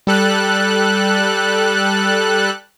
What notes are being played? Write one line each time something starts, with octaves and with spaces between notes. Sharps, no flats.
G3 A4 F#6